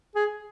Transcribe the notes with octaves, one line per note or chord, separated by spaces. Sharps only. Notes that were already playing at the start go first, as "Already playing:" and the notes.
G#4